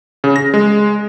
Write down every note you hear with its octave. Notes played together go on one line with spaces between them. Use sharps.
C#3
A#6
G#3